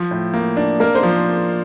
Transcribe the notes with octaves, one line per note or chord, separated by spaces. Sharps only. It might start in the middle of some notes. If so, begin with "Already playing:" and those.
Already playing: F3
A2
A#3
D4
A#3 A#4
C5
F3